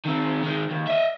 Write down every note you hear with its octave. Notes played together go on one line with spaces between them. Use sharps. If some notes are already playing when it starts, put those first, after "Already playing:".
D#3 C4
D#3 G#3
D#2
D#5 E5